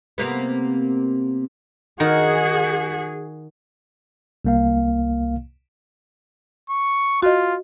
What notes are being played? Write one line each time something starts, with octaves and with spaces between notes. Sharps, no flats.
C3 A#3 B3
D#3 F#4 G#4
C2 A#3 F5
C#6
F4 F#4 D#5